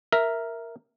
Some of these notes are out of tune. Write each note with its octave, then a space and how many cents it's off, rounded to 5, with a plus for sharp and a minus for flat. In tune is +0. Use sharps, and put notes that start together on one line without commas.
A#4 +0 E5 +0